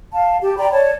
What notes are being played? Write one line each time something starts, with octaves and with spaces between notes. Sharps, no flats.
F5 A5
G4 A5
D5 G5 A#5 B5
C#5 D5 A5